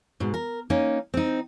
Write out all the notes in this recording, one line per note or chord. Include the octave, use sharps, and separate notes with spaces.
G#2 B2
A#4
A#3 C#4 D#4
C4 D#4